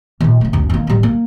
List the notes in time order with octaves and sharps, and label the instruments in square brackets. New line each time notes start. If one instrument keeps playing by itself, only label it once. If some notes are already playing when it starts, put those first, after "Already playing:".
[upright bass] D#2 A#2
C#3 A3
F#1 D2
D#3 A#3
A1 G3
A#3